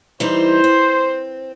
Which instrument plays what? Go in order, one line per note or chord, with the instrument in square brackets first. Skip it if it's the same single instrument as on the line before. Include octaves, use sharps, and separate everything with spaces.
[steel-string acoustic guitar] E3 G3 D#4 [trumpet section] C5
[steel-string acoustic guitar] C4